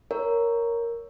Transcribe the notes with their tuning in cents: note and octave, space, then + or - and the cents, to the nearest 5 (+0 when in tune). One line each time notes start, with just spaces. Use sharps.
A#4 +0 C#5 +10